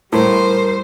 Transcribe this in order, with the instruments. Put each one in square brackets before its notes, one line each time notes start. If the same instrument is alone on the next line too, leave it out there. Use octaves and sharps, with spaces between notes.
[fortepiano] A2 [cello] G3 C5 [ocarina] A#4